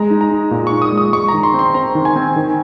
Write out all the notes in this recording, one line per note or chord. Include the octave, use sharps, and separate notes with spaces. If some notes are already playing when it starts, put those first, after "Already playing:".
Already playing: G#3 A#5
D#4
A#5
D#4
A#2
C#6
D#4
D#6
G#3
D#6
G#3 C#6
D#3 A#5
C6
C4
C6
C4 A#5
D#3
G#5
C4
D#3